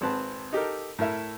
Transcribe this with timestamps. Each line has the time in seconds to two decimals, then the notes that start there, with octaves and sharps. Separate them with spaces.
0.01 G#1 C4 B4 A5
0.53 D#4 G4 A4 A#4
0.99 A2 E4 A#4 E5